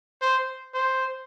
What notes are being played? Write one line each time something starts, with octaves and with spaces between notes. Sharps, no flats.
C5
C5